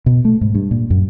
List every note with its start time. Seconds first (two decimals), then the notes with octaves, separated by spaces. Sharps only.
0.06 B2
0.25 A3
0.41 G#2
0.55 G2
0.71 A#2
0.90 F#2